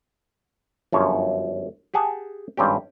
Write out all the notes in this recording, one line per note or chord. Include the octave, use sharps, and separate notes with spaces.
G1 F#2 F3 C#5
G4 G#4 F#5 G#5 A5
G#1 G2 C4 C#4 G4